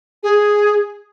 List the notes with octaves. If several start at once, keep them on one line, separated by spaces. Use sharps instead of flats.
G#4